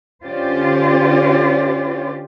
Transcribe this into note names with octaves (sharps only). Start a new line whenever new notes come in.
D3 C#4 F4 G4 C5 D5